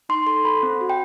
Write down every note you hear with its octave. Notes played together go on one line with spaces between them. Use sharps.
D#4 C6
A4 C6
A4 B5
C4
F#4
G5